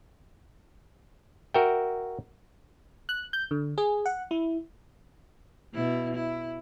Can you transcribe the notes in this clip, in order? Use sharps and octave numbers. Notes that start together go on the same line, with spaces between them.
F#4 A#4 E5 G5
F#6
G6
D3
G#4
F#5
E4
B2 E4
E4